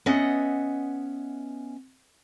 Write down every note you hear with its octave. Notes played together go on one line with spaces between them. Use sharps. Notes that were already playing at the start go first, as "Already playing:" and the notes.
B3 C#4 D#5 E5 F#5